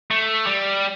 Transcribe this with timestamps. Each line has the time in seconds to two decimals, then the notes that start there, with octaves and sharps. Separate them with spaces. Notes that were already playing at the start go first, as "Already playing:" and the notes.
0.11 A3
0.47 G3